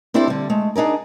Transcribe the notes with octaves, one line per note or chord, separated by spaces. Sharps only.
C4 D4 E4 G4 A4 C5
D3 G3
G#3 A3
D4 D#4 G#4 A#4